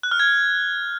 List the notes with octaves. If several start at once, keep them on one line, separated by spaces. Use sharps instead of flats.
F#6
F6
G#6